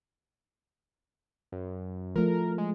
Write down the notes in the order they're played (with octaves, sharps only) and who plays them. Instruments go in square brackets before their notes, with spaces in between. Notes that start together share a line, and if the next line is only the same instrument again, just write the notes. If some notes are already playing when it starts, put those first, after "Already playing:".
[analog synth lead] F#2
[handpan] F3 A3 [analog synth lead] A#4
[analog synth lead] G#3